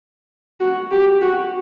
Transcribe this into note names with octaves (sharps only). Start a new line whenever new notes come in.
F#4
G4
F#4